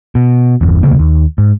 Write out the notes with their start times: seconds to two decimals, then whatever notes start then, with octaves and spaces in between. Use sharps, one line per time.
0.15 B2
0.61 G1 E2
0.83 E1 D2 C#3 A#3
0.99 D#2
1.38 G#2